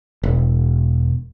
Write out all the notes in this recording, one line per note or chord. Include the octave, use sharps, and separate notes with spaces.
E1